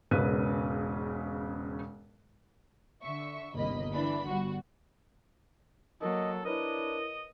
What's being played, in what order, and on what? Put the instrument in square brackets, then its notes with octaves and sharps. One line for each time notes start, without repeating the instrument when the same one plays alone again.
[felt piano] E1 G#2 C#3 C#4 B4 D#7
[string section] D3 E5 C#6
G1 D#2 C3 A#3 D#5 B5
D3 E3 D4 B5
G1 G3 F#4
[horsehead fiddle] F#3 A#3 [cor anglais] A4 [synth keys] A#4 [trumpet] D#5
[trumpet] D4 [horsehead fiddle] E4 [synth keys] A#4 B4 C#5 [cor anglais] D#5